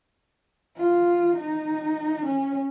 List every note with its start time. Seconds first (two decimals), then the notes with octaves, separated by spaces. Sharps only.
0.77 F4
1.36 D#4
2.25 C#4